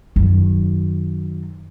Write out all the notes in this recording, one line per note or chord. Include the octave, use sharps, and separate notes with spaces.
F#2 D#3